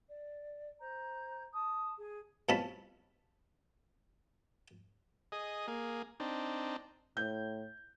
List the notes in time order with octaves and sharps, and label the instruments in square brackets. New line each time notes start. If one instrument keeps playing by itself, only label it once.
[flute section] D5
C5 A#5 G6
A5 D#6
G#4
[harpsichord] C2 B2 F3 C#4 A5 B5
[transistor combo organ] G#4 D#5
A#3 G#4
C4 D4 D#4
[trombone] A2 [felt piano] G6